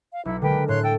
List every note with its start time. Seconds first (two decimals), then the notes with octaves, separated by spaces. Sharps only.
0.13 F5
0.25 B1 E4 C#7
0.41 D3 G#3 A#4 B4 G5
0.68 A2 C#5 C6 F#6
0.83 A4 G5